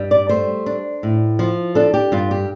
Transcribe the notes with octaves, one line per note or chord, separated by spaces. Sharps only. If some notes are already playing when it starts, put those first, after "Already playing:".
Already playing: G2 G3
D5
A3 C5
D4
A2
F3
D4 A4
G4
G2 F4
G4